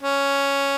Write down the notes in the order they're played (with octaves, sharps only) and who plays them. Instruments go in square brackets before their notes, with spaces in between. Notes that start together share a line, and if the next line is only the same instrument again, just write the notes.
[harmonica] C#4